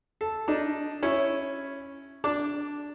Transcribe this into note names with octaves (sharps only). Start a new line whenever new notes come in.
A4
D4 D#4
C#4 E4
D4 D6